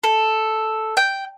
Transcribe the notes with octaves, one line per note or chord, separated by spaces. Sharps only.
A4
G5